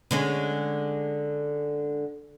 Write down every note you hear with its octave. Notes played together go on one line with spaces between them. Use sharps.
D3 G#3 C#4